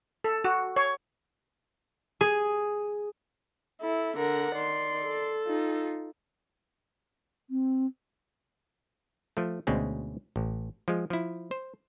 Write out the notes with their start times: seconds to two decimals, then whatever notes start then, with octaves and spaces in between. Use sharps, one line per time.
0.24 A4
0.44 F#4
0.76 C#5
2.21 G#4
3.81 E4 A4
4.17 D3 A#4 F#5
4.55 D#3 D5 C6
5.04 A4
5.47 D#4 F4
7.50 C4
9.37 F3 A3
9.67 D2 B2 G#3 C4 C#4
10.36 A1
10.88 F3 G#3
11.10 F3 E4
11.51 C5